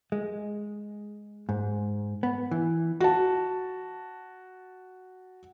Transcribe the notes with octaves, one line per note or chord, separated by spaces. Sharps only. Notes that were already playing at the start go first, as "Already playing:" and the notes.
G#3
G#2
B3
E3
F#4 A5